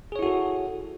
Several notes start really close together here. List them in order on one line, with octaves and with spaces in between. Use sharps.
G#4 C#5 E4 F#4 A4